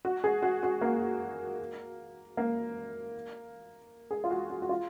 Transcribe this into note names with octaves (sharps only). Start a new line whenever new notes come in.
F#4
G#4
F#4
F#4
A#3
A#3
G#4
F4
F#4
F#4
F#4
F4